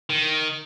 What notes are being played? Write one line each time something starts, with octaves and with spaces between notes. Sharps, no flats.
D#3